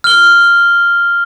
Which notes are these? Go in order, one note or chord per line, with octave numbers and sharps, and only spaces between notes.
F6 G7